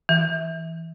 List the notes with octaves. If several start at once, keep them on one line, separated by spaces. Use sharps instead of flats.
E3